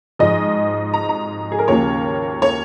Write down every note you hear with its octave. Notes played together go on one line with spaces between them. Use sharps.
G#2 F3 G#3 D#5
A#5
A#5
G#4
A#4
D#2 C#3 F3 A#3 C#5
C#5